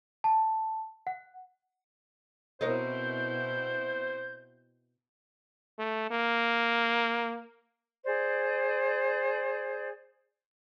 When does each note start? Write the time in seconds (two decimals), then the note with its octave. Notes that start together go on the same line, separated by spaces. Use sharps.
0.24 A5
1.07 F#5
2.61 B2 C4 E4 A#4 C5 C#5 D#5 G6
5.79 A3
6.11 A#3
8.05 G#4 C5 D5